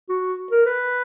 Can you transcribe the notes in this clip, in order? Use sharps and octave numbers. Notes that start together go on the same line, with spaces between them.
F#4
A#4
B4